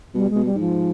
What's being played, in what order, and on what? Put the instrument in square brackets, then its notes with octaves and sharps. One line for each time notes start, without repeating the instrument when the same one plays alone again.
[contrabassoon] B2 [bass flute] G3
[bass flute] G#3
[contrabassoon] B2
[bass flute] G3
[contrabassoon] G#2 [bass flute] F3